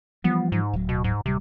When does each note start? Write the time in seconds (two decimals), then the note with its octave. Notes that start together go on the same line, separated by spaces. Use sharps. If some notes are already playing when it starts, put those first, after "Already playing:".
0.24 E3 F3 G3 B3
0.52 G#2
0.73 D1 F#3
0.89 B2
1.04 G#2
1.26 D1 C3 G3